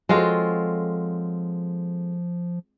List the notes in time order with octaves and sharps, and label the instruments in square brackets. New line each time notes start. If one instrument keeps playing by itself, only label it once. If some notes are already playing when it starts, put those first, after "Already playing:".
[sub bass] F3 [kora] G#3 C4 F4 [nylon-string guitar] F#4 A4 C#5